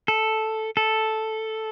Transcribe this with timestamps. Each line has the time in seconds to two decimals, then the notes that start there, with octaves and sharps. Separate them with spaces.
0.08 A4
0.77 A4